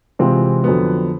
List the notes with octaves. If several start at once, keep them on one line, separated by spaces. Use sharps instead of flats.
C3 E3 G#3 C4 F4
F2 D3 F#3 B3